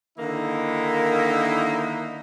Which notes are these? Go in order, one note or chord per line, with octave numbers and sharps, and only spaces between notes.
D3 D#3 A#3 D#4 E4